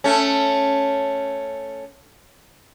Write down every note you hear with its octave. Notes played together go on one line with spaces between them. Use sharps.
A3 C#4